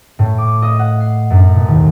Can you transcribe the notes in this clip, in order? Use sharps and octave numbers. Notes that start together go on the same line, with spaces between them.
A2
D6
D#5
F#5
C7
F#2
B2
D#2